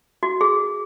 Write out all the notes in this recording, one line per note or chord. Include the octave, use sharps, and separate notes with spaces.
F#4
G#4